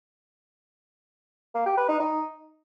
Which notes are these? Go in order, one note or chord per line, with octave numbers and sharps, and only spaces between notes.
A#3
G4
B4
D#4
D#4